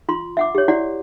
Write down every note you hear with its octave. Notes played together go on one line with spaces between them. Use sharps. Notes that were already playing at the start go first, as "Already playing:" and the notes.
F4 C6
E5 F#5 D6
G4 C#5
E4 F#4 D5 F#5